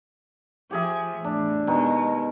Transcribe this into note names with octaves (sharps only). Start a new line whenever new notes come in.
F3 G4 G#4 E5
E2 A2 D4
B2 D#3 G#3